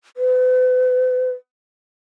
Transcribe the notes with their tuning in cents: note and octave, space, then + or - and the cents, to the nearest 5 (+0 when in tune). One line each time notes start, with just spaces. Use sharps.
B4 +45